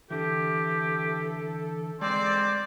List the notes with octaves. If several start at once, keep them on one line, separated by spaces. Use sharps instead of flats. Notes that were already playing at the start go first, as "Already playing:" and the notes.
D3 E3 G4 A4
G#3 C4 D5